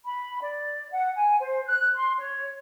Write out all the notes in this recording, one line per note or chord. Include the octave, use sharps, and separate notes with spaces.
B5
D5
F#5
G#5
C5
F#6
C6
C#5